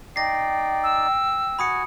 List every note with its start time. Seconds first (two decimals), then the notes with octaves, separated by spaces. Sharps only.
0.16 D#4 D5 G5 A#6 C7
0.83 E6
1.59 F#4 G#5 B5 D#6 C#7